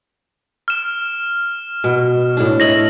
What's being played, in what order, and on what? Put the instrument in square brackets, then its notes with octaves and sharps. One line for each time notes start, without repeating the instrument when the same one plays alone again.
[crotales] F6 E7
[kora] B2
A2 D4
[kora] C#5 D#5 E5 [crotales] A#6 F#7